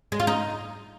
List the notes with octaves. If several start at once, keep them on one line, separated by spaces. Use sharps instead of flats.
G#3
F4
D#4